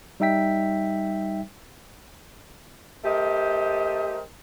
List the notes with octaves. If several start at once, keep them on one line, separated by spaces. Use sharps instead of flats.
G3 D#4 E5 G5 B6
A3 G4 A#4 C5 D#5